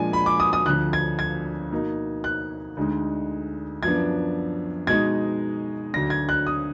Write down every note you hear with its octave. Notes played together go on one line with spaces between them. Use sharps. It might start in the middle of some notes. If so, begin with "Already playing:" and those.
Already playing: A#2 F3 G#3 D4 G#5
B5
D6
D#6
D#6
D2 D3 F3 F#6
G#6
G#6
B2 A#3 D#4
F#6
D2 D3 G#3 D#4
F#2 F3 B3 D4 G#6
B2 G#3 D#4 G#6
D2 D3 F#3 D4 A#6
G#6
F#6
D#6